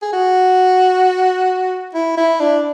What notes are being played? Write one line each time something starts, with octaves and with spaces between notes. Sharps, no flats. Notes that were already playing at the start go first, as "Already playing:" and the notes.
G#4
F#4
E4
E4
D4